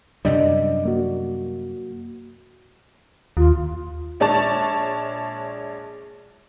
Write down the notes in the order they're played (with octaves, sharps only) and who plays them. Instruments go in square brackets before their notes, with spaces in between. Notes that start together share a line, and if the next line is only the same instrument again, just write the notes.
[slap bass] F#2 C3 G3 [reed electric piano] D4 D5 D#5
[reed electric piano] A#3 F#4
[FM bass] D#2 [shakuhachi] F4
[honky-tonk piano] A#1 G#3 C#5 D5 A5 A6